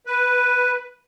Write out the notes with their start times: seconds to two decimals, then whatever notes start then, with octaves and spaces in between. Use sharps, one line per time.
0.06 B4